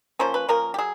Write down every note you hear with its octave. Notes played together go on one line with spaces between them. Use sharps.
F3 A#3 C#4 C5
B4
F3 A#3 C#4 A#4
G4
F#3 G#4